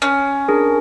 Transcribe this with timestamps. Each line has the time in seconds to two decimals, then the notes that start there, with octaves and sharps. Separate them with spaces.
0.02 C#4
0.48 D4 G#4 A#4